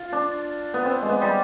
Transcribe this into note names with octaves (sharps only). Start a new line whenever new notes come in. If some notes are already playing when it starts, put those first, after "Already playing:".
Already playing: F4
D4
B3
C4
G#3
B3
G3